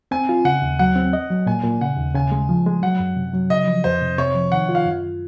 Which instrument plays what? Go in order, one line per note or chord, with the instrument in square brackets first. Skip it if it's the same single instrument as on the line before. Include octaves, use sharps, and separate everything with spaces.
[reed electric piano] C4 [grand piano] G#5
[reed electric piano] F4
[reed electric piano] C#3 [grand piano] F#5
[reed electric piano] D#2
[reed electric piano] F#3 [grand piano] F#5
[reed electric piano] C4
D#5
F#3
[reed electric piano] A#2 [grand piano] G#5
[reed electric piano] A#2
[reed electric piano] C#3 [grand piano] F#5
[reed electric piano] D#2
[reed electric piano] C#3 [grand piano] G#5
[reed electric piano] G#3
F3
G#3
[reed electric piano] F#3 [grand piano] F#5
[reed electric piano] F#2
C3
F#3
[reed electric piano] C#3 [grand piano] D#5
[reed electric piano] F3
[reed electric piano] F2 [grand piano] C5
[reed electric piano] C3
[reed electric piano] C3 [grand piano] C#5
[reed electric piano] F3
[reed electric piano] D#3 [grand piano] F#5
[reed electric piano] F4
[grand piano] F5
[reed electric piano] F#2